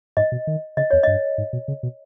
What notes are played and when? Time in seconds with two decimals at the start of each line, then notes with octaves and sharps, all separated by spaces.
0.17 G#2 D#5
0.32 B2
0.47 D#3
0.77 C#3 D#5
0.90 E2 C#5
1.03 G2 D#5
1.38 G#2
1.53 B2
1.68 C#3
1.83 B2